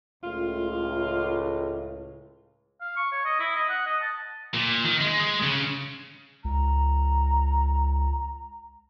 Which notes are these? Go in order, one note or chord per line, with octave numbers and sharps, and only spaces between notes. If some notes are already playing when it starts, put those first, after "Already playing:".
C#2 A2 F4
F5
C#6
C#5
D#5
E4
D#5
F#5
D#5
A5
A#2
D#3
G#3
G#3
C#3
C#2 A#5